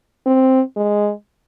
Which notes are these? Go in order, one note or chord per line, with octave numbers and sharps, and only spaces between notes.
C4
G#3